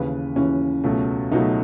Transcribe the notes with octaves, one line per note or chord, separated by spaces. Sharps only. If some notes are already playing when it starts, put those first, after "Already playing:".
Already playing: D#2 C#3 E3 B4
D#2 C#3 E3 C#4
C#2 B2 F#3 A3
C#2 B2 F#3 A3 D#4